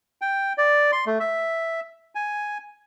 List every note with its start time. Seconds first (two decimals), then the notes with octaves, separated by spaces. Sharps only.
0.22 G5
0.58 D5
0.92 C6
1.07 A3
1.20 E5
2.15 G#5